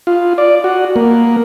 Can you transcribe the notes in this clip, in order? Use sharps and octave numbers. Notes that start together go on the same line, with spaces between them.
F4
D5
F#4
A#3